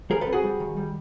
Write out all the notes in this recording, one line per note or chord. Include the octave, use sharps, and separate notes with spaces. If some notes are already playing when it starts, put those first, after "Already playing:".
G3 G#4 A#4
A4 B4
C4
F#4 G#4
G3
D#3
G3